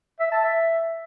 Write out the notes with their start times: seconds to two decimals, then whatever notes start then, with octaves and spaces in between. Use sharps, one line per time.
0.20 E5
0.32 A5
0.44 E5